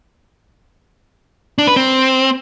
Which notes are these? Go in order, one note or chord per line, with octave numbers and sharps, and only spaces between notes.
D4
B4
C4